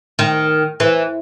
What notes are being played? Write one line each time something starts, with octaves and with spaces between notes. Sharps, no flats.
D#3
E3